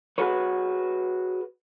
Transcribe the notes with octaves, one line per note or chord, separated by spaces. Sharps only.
F#4 G#4 B4 C#5